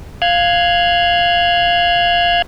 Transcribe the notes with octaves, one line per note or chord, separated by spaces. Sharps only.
F5 F6 F#6 G#6